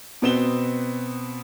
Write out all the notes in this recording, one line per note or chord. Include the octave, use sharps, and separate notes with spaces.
B2 B3 C4 E7 G7